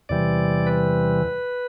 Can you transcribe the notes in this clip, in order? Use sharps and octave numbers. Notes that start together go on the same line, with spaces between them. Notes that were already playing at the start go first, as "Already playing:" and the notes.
E2 C3 E3 G3 D5
B4